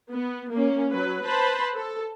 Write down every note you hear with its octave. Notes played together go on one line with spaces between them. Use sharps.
B3
A#3 C#4
F#3 B4
B4 C5 A5 B5
A4